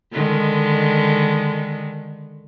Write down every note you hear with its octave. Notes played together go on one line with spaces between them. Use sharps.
D3 D#3 G#3